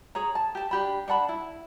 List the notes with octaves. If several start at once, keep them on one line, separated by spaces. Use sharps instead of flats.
G#4 C#5 A#5
A5
G4 A5
D4 G4 B5
D4 F#5 A5 B5
E4